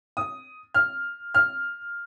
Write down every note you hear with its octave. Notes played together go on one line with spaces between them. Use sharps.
D#6
F6
F6